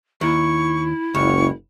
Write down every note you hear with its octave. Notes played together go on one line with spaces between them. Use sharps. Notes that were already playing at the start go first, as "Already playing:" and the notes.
D#2 E4 C#6
F#1 C#2 C#6